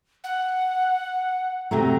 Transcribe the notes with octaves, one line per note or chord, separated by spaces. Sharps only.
F#5
C3 F#3 A3 A#5